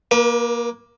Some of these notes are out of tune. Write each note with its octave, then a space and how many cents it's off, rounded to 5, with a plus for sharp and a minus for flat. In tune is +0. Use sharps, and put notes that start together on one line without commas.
A#3 +15 B4 -40